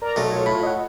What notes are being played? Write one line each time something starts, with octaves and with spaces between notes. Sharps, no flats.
A#4 D5 A#5
B1 A3
F4 C#5
A2 B5
D#5 F#5